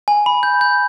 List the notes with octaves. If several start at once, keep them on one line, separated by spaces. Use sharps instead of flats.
G#5
B5
G6
G6